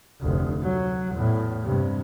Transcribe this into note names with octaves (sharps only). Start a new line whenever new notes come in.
F1 D2
F#3
E2 A2
G2 C3